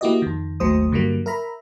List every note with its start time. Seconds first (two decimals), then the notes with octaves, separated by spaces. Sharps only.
0.01 A#3 E4 F#4 G4 D5 D#5
0.22 F2 D#3
0.60 G#1 D#2 F#3 A3 C5 D#6
0.91 G2 D3 F#3 G3 A#3
1.26 A#4 E5 A#5 B5